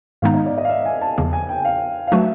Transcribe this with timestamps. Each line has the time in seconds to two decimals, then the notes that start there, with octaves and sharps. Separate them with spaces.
0.22 G#2 D#3 G#3 B3 D#4 F5
0.34 D#5
0.46 D5
0.58 D#5
0.65 F5
0.70 E5
0.86 G#5
1.01 A5
1.18 E2 C#3 F3 A#3
1.33 G#5
1.49 G5
1.65 F5
2.07 F5
2.12 F#3 A3 D4 F#4 B4 E5